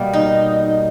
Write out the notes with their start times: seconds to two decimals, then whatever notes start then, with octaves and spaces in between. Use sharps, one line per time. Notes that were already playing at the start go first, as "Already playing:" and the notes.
Already playing: B2 G3 A#3
0.13 D#4